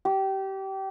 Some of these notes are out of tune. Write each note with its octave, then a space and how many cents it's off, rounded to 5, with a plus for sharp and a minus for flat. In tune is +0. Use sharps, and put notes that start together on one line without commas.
G4 -25